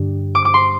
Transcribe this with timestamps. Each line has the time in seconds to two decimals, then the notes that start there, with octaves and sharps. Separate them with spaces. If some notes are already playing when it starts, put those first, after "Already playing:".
Already playing: G2 D3 G3
0.35 D6
0.45 D6
0.54 C6